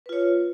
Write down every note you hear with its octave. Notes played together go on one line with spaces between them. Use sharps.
F4 B4 C#5